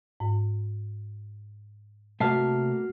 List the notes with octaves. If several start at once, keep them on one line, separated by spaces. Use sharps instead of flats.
G#2
C3 A3 A#3 F#4 E5 A5 F6 C7